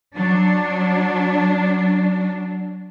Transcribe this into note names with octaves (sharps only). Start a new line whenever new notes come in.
F#3 D4